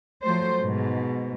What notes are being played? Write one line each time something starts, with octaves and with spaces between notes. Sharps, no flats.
F3 F#3 A3 C5
G#2 B2